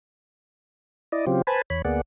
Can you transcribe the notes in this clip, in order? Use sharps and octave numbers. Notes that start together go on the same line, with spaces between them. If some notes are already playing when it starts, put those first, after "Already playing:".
E4 D5 D#5
C#3 F#3 C4 F4 G4
B4 C5 G#5 A5 B5
E2 C#5 B5
D2 A#3 B3 G#4 D5 F#5